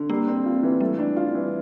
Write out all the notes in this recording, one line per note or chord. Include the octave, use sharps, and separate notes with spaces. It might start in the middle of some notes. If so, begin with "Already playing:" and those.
Already playing: D3
G3 A#3
C4
F4
E3
G3 A3
D4
F4
E3